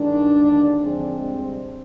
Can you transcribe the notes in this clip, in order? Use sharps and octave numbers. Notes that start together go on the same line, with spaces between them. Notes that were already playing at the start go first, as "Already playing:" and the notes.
Already playing: G2 D#3 G#3 D4
D#2 D3 G#3
D#2 D3 F3 G#3 C4
D2 C3 G3